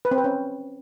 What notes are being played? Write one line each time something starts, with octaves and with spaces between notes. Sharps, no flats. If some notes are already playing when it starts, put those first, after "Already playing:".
B4
C4
B4
C#4